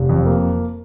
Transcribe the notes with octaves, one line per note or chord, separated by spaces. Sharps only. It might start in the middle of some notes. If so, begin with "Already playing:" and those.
Already playing: F1
F2
A#3